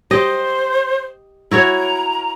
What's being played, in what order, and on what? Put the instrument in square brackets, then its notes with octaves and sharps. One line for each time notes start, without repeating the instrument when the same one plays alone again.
[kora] G4 D#5 [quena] C5
[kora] E4 F#4 C#5 [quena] A#5